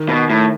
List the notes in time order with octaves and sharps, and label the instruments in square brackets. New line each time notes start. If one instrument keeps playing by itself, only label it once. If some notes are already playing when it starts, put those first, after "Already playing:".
Already playing: [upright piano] D#3
[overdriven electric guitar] B2
A2